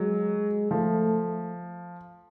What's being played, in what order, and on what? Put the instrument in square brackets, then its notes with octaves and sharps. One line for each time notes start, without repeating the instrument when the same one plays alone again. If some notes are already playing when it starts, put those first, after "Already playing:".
Already playing: [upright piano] F#3 [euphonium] G#3
[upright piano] F3 [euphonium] A3